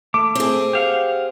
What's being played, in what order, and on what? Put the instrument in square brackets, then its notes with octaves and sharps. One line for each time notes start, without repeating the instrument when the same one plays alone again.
[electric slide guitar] A3 [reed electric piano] D6
[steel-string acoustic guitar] C4 G#4
[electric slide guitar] G4 F5 F#5